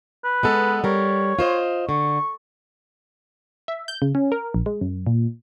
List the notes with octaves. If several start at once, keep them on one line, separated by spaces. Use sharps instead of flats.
B4
G#3 B3 A4
G3 A#4 C#5
F4 C5 D#5
D3 C#6
E5
G6
C#3
C#4
A#4
A#1
G#3
F#2
A#2